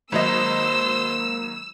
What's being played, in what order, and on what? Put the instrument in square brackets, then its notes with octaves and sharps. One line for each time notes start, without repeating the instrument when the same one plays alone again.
[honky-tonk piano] G#1 F#3 D#5 [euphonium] A#3 [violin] C5 [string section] E6